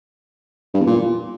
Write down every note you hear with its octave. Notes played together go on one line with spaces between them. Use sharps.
G2
E2
A#2